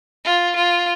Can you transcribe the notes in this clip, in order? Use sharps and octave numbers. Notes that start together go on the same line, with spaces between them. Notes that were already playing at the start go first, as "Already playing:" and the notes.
F4
F4